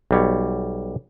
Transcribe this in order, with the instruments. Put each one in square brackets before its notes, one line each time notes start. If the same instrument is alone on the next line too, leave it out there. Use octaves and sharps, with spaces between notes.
[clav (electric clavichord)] B1 G3 C#5